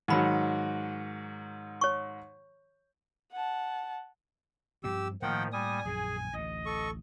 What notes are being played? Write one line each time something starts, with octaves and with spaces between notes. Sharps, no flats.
G#2 D#3 F#3 D#4 B5
C#5 C#6
F#5 A5
G2 F3 C4 G4 E6
A2 D#3 F3 A#3 F#5 G5
G3 G#5 D#6
A#1 F#2 A#2 G#4
A1 D2 D#5
A4 C#6